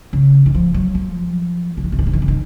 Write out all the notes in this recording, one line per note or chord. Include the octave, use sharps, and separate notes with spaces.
C#3
D#3
F3
F#3
F3
C#3
D#3
C#3
D#3
C#3
D#3
C#3
D#3